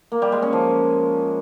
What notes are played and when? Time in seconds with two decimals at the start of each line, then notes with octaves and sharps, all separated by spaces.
0.12 A#3
0.22 G3
0.32 G#3
0.42 C#4
0.53 F3